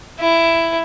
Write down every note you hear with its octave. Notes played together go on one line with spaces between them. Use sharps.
E4